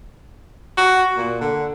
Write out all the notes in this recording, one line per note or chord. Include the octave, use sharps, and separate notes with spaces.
F#4
A#2
D3